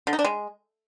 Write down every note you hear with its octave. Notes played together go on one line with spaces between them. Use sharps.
D3
D#4
D4
G#3